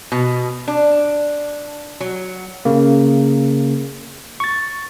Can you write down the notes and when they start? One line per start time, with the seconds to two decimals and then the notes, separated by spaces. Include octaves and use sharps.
0.12 B2
0.68 D4
2.00 F#3
2.65 C#3 A#3
4.40 C#6 A6